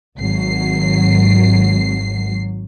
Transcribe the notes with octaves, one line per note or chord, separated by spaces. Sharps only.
G#1 F#3 C7